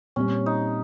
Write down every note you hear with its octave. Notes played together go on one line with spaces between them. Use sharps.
A#2 G3 C4 C#4 G4 C#5
D#4